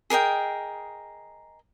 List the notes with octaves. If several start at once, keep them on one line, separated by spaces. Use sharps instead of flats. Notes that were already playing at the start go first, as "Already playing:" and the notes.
G#4 A#4 D#5 G5